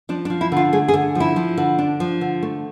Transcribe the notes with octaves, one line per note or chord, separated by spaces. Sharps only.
F3 D4
D4
F3
E4
D3 F4
A3 G#4
G#4
D3
F3
E4
F3
D3
D4
F3
D3
A3